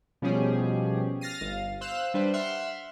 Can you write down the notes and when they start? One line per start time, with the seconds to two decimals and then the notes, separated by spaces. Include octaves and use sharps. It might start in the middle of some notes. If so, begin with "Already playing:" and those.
0.22 B2 F3 G3 C#4 G4 G#4
1.21 F6 A6 A#6 C7 D#7
1.41 G1 F5
1.81 C5 F5 E6 F#6
2.14 G3 D4 B4 C5
2.34 E5 F#5 C6 F6